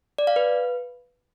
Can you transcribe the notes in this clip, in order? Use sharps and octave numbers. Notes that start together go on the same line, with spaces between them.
D5
F5
B4